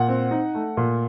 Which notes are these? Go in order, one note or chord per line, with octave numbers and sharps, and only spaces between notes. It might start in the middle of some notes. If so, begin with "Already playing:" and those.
Already playing: A#2 F#5
C4
D#4
A3
A#2